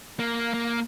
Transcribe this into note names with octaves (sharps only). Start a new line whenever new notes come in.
A#3
A#3